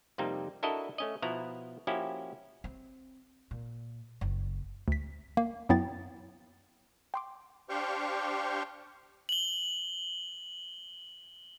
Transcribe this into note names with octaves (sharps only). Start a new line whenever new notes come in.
F2 C3 G3 A#3 C4 D#4
D4 E4 F#4 A4 A#4 D#5
A3 C#4 D#5
B2 F3 E4 F#5 A#5
F3 A#3 C#4 E4 F#4 G4
C4
A#2
F#1
D2 B6
A#3
F#2 F#3 B3 E4 G5 A6
G5 C6 D6
D4 G4 C5 F5 G5 C#6
F#7 G7